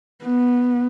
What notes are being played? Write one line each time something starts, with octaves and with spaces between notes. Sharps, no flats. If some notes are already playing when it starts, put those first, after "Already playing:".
B3